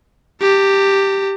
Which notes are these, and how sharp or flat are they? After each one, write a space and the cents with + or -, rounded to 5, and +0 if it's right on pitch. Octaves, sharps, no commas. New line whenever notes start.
G4 +0 A5 +45